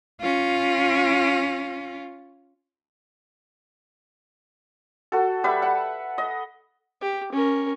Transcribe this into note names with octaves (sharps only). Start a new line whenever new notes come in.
C#4 F4
F#4 A4
G3 B4 E5
F#5
D#5
G4
C#4 A#4